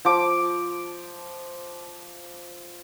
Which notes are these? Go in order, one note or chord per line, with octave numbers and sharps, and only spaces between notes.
F3 D6